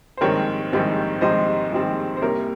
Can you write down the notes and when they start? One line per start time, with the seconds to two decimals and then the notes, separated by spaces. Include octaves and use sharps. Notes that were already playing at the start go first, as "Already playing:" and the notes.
0.17 C5
0.21 A#1 G#2 D#3 G3 C4 A#4 C#5
0.72 A#1 G#2 D#3 G3 C4
1.21 A#1 G#2 D#3 G3 C4 C5 D#5
1.72 A#1 G#2 D#3 G3 C4
2.17 C5
2.22 C2 C3 G3 A#3 A#4 C#5